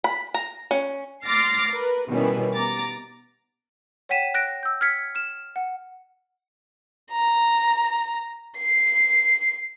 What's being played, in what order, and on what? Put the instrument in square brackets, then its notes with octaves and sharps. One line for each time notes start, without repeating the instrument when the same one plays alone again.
[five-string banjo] B5
A#5
C#4
[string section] C6 D6 F6 A6 A#6 C7
A#4 B4
B2 D#3 E3 G3 B3 C#4
B3 A#5 D6 A6
[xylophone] C#5 F#5 G5 B6 D#7 E7
F#6 A#6 D7
E6 G6
F6 G#6 B6 C#7
F6 E7
F#5
[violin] A#5
C7